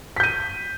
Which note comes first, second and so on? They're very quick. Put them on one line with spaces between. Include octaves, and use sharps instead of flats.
B6 G6 D#7